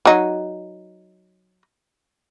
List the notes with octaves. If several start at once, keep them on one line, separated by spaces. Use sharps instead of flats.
F#3 D#4